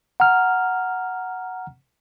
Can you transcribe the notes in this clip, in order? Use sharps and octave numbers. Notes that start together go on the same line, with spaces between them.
F#5 A#5 F6